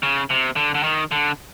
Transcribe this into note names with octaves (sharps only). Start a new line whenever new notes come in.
C#3
C3
D3
D3
D#3
D3